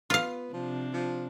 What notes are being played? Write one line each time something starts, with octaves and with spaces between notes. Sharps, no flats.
B3 F4 F5
C3 F3 D4
F3